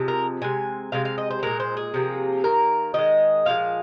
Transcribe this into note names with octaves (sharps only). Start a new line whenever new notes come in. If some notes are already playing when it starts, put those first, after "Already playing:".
Already playing: C3 F3 G#3
A#4
C3 G#3 G#5
C3 G#3 F5
F5
D#5
C5
A#2 G#3 A#4
C5
G#4
C3 F3 A#3
D#3 A#3 A#4
D#3 G#3 D#5
A#2 F3 G#3 F5